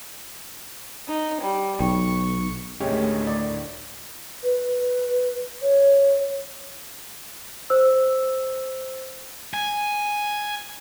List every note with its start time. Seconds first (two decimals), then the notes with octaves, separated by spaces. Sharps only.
1.08 D#4
1.42 G3
1.80 B1 C#6
2.80 D2 A2 D#3 G#3 C#4 G4
3.27 D5
4.43 B4
5.62 C#5
7.70 C5 E6
9.54 G#5